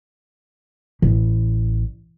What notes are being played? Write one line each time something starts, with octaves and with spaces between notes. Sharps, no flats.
A1